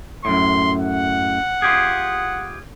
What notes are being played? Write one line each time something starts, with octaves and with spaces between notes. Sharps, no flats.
F#2 A2 C6
F#5
F4 G4 G#4